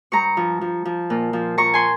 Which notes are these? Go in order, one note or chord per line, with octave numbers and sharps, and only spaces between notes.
G2 A#5 C#6
F3
F3
F3
A#2
F3
F3 A#5 C#6
G#5 C6